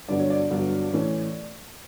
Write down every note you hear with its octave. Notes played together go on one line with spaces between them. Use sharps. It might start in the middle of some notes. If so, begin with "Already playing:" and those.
G2 D3 F#3 B3 D5
C#5
D5
G2 D3 F#3 B3
A2 E3 A3 C#4